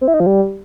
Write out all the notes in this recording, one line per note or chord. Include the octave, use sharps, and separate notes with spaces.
C4
E4
D#4
F3
G3